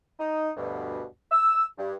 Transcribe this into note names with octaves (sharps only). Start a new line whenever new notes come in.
D#4
D2 G2 B2
E6
G2